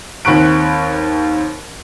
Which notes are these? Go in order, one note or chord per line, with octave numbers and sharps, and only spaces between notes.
D#2 C4 B5 C#6 F#6 D7